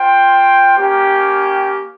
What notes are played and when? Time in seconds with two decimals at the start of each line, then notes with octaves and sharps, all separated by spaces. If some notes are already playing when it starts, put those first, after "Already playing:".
Already playing: F4 C5 G5
0.78 A#3 C#4 G4